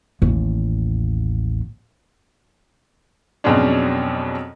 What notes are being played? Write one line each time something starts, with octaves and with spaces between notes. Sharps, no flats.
A1 D#2
F2 B2 F#3 G#3 C#4 D4